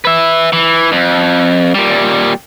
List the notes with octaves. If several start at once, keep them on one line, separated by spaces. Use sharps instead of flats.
B4 E5
E3
F2
A#2 G3